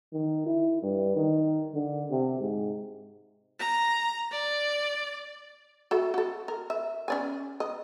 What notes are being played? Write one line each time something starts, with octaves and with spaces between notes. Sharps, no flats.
D#3
E4
G2
D#3
D3
C3
G#2
A#5
D5
F#4 A4 E5
F#4 A4
A#4
E5
C#4 D5 G#5
D#5